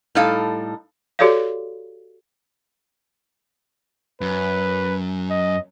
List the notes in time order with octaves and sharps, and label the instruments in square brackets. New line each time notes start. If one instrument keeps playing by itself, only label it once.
[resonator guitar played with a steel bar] A2 G3 D#4 A4 F5
[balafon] F#4 G4 A4 C#5 D5 F5
[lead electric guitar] F#2 [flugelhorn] B4
[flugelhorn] D#5